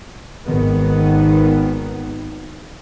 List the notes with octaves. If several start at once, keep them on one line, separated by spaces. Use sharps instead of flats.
G#1 D#3 B3